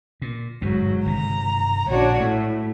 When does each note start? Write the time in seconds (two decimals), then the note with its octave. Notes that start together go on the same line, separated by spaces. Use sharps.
0.22 A#2
0.62 G1 E2 G#2 B2 F#3
1.05 G1 C3 D#3 A#5
1.88 A#1 D4 F#4 C#5
2.20 A2 A3